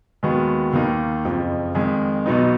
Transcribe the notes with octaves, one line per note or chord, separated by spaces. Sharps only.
D#2 D#3 G#3 B3 F#4
D#2 D#3 A#3 D#4
F#1 F2 F3
F2 D#3 G#3
B1 B2 F#3 B3 D#4